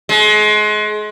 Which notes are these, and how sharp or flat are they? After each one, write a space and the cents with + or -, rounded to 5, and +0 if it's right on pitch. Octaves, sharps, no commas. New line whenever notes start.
G#3 +30